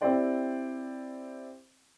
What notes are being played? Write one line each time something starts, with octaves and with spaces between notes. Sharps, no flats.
C4 E4 G4 C5 D5 G5